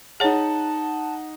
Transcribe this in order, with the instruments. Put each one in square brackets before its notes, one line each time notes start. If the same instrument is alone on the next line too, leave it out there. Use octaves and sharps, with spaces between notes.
[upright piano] D#4 F#5 [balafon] G#4 C#5 [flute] A5